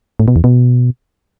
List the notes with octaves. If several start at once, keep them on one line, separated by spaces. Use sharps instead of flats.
A2
B2
E2
B2